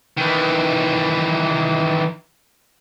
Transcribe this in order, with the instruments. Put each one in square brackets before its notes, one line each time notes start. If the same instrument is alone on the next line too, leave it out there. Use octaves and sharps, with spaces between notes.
[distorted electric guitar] D#3 E3